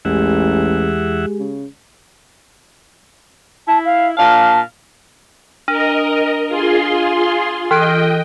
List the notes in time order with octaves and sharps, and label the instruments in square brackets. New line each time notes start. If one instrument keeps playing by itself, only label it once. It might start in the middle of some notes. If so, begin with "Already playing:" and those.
[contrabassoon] A1 [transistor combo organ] E2 E5 F#5 [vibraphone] G#3 G4 G#4
[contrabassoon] C#3
[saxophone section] E4 [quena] A5
[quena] F5
[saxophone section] A#2 D4 F5 [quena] A5
[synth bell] D4 [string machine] A#4 D#5
[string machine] F4 G#4 C6
[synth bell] E3 F#6 D7 [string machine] D#5 G5